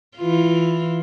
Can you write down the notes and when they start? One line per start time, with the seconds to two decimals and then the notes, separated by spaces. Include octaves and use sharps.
0.17 E3 F4